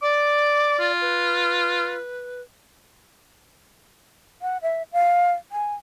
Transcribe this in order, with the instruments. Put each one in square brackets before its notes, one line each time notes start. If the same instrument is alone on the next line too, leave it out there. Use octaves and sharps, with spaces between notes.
[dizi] D5 [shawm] D6
[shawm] F4
[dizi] B4
[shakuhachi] F#5
E5
F5
G#5